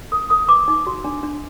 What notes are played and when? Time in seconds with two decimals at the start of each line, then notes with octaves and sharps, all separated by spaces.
0.12 A#4 D#6
0.30 A#4 D#6
0.48 B4 D6
0.68 D#4
0.87 F#4
1.04 D4
1.23 D4